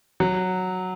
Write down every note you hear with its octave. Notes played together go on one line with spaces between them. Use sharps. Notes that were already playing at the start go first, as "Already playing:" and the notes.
F#3